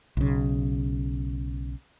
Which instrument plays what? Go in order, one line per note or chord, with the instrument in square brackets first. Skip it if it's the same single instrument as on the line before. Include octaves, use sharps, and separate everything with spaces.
[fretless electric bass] B1 C#3